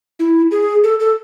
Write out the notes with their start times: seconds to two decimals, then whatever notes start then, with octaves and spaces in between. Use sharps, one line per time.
0.19 E4
0.51 G#4
0.84 A4
1.00 A4